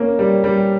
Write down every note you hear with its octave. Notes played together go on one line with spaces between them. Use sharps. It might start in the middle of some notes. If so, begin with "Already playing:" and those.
Already playing: A#3 C#4
G3
G3